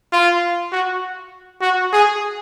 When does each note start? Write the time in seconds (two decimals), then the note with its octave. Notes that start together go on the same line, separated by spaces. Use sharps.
0.12 F4
0.72 F#4
1.62 F#4
1.93 G#4